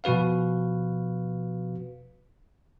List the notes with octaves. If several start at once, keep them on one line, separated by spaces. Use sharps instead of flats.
B2 F3 F#4 B4 F5